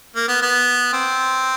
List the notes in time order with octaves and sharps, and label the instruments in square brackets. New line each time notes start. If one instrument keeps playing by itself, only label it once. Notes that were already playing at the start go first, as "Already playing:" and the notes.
[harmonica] A#3
B3
B3
C4